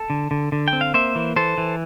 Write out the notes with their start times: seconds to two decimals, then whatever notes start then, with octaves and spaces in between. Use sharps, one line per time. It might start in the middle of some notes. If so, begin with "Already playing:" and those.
Already playing: A4
0.10 D3
0.31 D3
0.52 D3
0.68 G5
0.73 C4
0.81 F5
0.94 A#3 C5 E5
1.15 E3
1.36 E3 A4 C5
1.58 E3